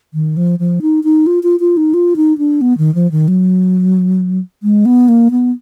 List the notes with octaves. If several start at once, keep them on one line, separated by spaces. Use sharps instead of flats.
D#3
F3
F3
D#4
D#4
F4
F4
F4
D#4
F4
D#4
D4
B3
D#3
F3
D#3
F#3
G#3
B3
A#3
B3